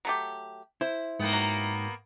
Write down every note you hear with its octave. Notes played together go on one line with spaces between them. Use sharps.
F#3 A3 G4
E4 C5
G#2 A#3 B3 G5
F#3